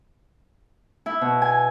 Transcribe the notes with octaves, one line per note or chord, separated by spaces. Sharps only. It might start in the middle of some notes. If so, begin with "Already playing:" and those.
E4
B2
G#5